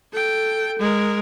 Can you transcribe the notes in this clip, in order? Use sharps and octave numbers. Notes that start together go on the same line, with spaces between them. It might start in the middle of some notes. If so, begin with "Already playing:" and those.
A4 G5
G#3 A#4